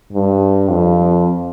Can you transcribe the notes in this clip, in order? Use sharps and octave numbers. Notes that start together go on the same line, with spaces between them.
G2
F2